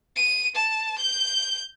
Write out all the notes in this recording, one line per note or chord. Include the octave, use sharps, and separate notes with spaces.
D#7
A5
G6